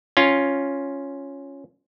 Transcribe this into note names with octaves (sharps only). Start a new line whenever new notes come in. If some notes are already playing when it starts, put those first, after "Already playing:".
C#4 F4